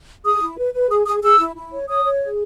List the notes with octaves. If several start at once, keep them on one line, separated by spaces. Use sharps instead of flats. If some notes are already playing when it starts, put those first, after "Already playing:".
G#4 D#6
E4
B4
B4
G#4 D#6
G#4 D#6
G#4 E6
E4
E4
C#5
C#5 D#6
C#5
G#4